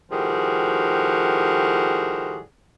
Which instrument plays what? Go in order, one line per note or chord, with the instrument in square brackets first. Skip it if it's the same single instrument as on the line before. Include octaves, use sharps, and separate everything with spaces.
[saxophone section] A2 D#3 F3 G3 F#4 G#4